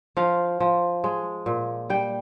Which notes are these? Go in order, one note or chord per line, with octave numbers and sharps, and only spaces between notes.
F3 F5
F3
G#3
A#2
G3 G5